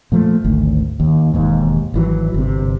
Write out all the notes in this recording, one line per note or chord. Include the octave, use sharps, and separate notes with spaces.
A#2 F3 A3
G#1 D2
D#2
E1 D#2 G#2
G#1 E3 F#3
G1 C3